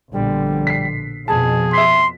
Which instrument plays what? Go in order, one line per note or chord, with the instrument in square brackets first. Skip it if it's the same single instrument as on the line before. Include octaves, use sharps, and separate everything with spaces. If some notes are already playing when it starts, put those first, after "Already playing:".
[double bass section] A#1 B2 D3 [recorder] G3
[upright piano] B6 C7
[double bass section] F2 B2 [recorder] G#4 [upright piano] A5
[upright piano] E5 B6 [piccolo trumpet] C6